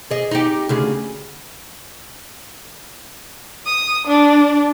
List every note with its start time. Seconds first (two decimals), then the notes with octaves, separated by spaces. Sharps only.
0.11 G#4 D#5
0.31 D#4 G4
0.69 D2 C#3 G#4
3.66 D#6
4.07 D4